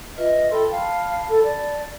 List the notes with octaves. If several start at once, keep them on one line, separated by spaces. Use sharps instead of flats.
F4 B4 D#5 E5
A4 G5 B5 C6
F5 A5 B5
A4
D5